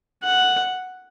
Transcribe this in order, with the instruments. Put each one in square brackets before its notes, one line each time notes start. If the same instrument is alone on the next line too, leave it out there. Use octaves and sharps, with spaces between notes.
[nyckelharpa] F#5